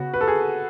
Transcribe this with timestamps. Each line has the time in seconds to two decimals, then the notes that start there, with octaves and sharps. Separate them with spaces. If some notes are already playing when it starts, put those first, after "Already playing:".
Already playing: C#3 B3 F#4
0.14 B4
0.21 A4
0.28 G#4